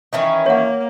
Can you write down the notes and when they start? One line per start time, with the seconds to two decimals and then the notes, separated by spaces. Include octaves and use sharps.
0.13 D#3 E3 C#4
0.46 A#3 C#5 F#5